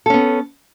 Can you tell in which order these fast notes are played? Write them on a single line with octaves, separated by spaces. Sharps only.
A4 C#4 B3